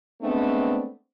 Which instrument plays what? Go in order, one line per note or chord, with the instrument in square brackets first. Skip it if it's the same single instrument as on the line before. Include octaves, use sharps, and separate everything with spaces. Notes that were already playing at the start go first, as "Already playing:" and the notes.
[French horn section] G#3 A3 B3 C4 D4